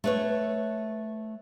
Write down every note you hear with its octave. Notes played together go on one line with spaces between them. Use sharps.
A3 B4 C#5